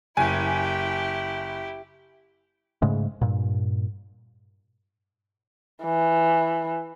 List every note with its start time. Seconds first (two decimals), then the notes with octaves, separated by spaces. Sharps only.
0.17 F#1 E4 G4 G#5
2.82 G#2 C#3 G#3 A3
3.21 G2 A#2
5.84 E3